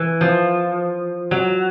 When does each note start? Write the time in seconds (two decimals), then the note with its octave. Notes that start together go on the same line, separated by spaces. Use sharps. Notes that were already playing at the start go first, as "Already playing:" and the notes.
Already playing: E3
0.21 F3
1.31 F#3